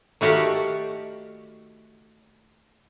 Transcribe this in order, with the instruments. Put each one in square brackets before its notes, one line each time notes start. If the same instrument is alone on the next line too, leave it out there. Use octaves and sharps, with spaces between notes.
[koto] D#3 A3 F#4 G4 D5 F5